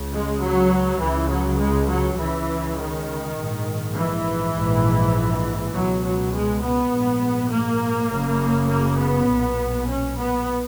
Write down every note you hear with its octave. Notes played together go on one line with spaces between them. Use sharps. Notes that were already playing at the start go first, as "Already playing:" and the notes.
Already playing: C#2 C#3
G#3
F#3
C#2 C#3 E3
F#3
G#3
F#3
C#2 C#3 E3
D#3
A#1 G#2
E3
A#1 G#2
C#2 B2 F#3
F#3
G#3
B3
A#1 G#2
A#3
F#1 F#2 C#3
A#3
B3
B1 A#2
C#4
B3